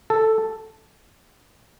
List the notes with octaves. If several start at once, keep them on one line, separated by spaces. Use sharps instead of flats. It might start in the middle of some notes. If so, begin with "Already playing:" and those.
A4